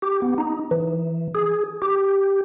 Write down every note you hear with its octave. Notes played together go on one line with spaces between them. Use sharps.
G4
B3
D#4
E3
G#4
G4